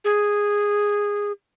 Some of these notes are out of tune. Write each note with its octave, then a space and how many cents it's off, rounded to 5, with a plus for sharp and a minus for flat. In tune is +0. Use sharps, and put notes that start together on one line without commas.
G#4 -10